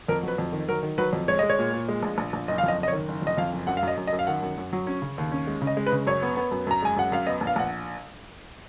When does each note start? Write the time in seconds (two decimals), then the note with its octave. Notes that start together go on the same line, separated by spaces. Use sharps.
0.09 F2 A#4
0.23 F#3 B4
0.38 F2
0.53 D#3
0.68 F#3 A#4
0.83 D#3
0.98 F#3 B4
1.13 F2
1.28 G#3 C#5
1.39 G#3 D#5
1.50 C#5
1.59 A#2
1.73 A#2
1.88 G#3
2.03 A#1
2.18 A#1
2.33 A#1
2.48 F#1 D#5
2.58 F5
2.63 F2 D#5
2.78 F#1 D#5
2.88 C#5
2.93 D#3
3.08 F#1
3.22 F2 D#5
3.38 F2 F5
3.52 F#1
3.67 F#2 F#5
3.77 F5
3.83 F#2 D#5
3.97 F#2
4.07 D#5
4.13 F#2
4.19 F5
4.27 D#3 F#5
4.42 F#2
4.58 F#2
4.73 F#3
4.87 C#4
5.02 C#3
5.18 D#2
5.32 C#4
5.47 G#3
5.62 C#3
5.67 D#5
5.77 G#3
5.86 B4
5.92 C#3
6.07 F#2 C#5
6.22 B3
6.37 B3
6.51 F#2
6.67 F#2 A#5
6.82 G#3 G#5
6.96 F#2 F#5
7.12 F#2 F5
7.27 B3 D#5
7.41 A#1
7.47 F5
7.56 A#1 F#5